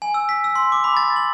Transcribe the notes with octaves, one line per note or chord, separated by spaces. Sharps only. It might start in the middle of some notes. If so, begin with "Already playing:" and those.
G#5
E6
B6
E6
C6
D6
B5
A6
F#7